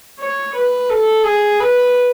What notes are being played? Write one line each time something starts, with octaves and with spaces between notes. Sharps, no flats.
C#5
B4
A4
G#4
B4